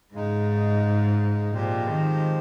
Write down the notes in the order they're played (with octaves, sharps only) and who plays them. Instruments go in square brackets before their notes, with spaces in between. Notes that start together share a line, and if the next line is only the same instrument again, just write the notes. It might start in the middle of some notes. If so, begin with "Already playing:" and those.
[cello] G#2 [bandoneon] C#3 G#3 D#4
[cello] A#2 [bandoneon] F3 G#3 C4 G4 C5
[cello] D#3